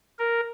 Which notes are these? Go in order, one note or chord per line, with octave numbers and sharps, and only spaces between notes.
A#4